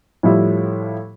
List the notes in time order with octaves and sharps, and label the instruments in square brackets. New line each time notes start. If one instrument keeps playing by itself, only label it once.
[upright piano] A2 F3 G3 E4